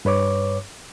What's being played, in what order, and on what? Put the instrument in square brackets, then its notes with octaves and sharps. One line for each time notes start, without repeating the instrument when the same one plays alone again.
[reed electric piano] G2 B4 C#5 D6